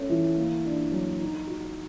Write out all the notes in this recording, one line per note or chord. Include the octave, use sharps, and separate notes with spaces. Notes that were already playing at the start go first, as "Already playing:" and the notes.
Already playing: A3 C#4
E3
A#3
D4
F#3
D#4
F#4